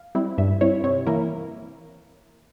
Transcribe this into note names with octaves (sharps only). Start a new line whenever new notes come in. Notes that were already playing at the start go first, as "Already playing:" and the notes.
Already playing: F5
G3 C4 E4
G2 E5
G3 C4 E4 C#5
C3 C#5
E3 A#3 E4 A#4